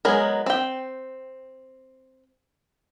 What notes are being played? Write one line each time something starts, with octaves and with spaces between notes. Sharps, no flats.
F#3 G#3 B3 G#4 A#4
C4 G5